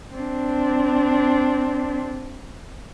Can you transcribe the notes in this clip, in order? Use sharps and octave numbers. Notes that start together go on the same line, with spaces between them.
C4 D4